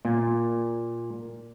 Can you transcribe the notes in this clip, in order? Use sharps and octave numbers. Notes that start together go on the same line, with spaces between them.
A#2